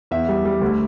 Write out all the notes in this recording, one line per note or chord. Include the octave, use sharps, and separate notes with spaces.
E2 E5
G3
G3
D2